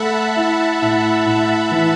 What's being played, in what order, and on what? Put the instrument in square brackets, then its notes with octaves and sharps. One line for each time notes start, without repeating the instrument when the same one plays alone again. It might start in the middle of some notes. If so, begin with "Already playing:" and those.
Already playing: [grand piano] A3 A4 [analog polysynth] E5 F#5 A5 B5
[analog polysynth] F#5
[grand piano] E4
A2
A2
E3